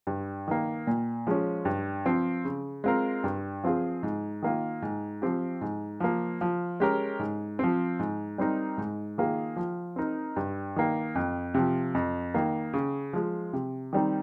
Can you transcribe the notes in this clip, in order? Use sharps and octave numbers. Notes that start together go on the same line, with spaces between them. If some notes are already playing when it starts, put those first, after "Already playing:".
G2
D#3 A#3
A#2
F3 G#3 C#4
G2
F3 C4
C#3
G#3 C4 F4 A#4
G2
F3 C4 F4 G#4
G#2
D#3 A#3 F4
G#2
F3 C4 G4
G#2
F3 A#3
F3
G#3 C#4 G4 A#4
G#2
F3 C4
G#2
G3 C4 D#4 A#4
G#2
D#3 A#3 F4 G#4
F3
C4 D#4 A#4
G2
D#3 A#3
F2
C3 F3
F2
D#3 A#3
C#3
F3 G#3
C3
D#3 G3 C4 D#4